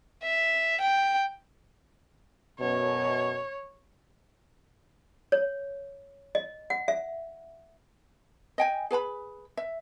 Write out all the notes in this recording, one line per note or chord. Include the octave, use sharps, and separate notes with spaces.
E5
G5
F#2 B2 C#5
C#5
D#5
F#5
E5
D#5 G5 G#5
G#4 B4 A5 B5
E5